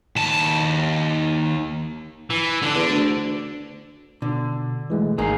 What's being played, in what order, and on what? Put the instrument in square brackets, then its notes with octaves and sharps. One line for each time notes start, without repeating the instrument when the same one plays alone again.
[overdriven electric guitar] D#2 A5
[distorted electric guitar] E3
D3 D4
[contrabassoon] E2
D2
[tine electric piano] B2 [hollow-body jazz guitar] D3
[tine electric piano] E3 G#3 A3
[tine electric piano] G#1 C7 [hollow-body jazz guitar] A#3 D#4 G#4